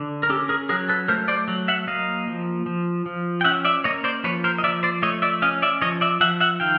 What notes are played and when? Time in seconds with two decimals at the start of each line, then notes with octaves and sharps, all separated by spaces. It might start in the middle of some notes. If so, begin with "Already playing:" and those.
Already playing: D3
0.23 A#4
0.29 C#4 G4 A4
0.49 G#4 A#4
0.69 F#3 G#4 A#4
0.89 A4 B4
1.08 A3 A#4 C5
1.28 C5 D5
1.48 F#3
1.68 E5 F#5
1.87 A#3 D#5 F5
2.27 F3
2.66 F3
3.06 F3
3.41 G5
3.44 C#4 E5 F#5
3.65 D5 E5
3.84 A#3 C#5 D#5
4.04 C5 D5
4.24 F3 B4 C#5
4.44 A#4 C5
4.58 D#5
4.63 F3 D5 E5
4.83 C5 D5
5.02 A3 C#5 D#5
5.22 D5 E5
5.42 C#4 D#5 F5
5.62 D5 E5
5.82 F3 C#5 D#5
6.01 D5 E5
6.21 F3 E5 F#5
6.40 E5 F#5
6.60 D#3 F5 G5